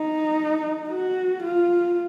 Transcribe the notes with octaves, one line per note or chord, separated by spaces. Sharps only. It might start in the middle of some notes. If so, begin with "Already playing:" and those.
Already playing: D#4
F#4
F4